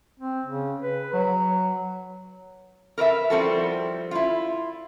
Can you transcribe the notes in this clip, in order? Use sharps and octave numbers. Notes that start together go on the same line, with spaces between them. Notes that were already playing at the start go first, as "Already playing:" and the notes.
C4
C#3
B4
F#3
A#4 B4 D5 E5
F3 G3 C4 E4 F#4 A4
E4 F4